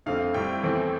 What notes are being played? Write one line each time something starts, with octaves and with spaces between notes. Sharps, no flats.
F2 D3 A3 C4 F5
A2 G3 C4 G5
E2 E3 A3 C4